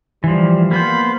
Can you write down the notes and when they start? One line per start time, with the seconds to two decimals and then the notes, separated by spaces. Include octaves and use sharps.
0.24 E3 F3 G3
0.71 A#3 B3 C5 B5